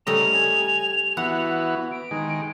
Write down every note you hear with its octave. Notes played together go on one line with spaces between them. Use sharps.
C#3 G3 A3 A#4 D#5 F7
G#5
E3 B3 F#4 F#5
D7
D#3 G#3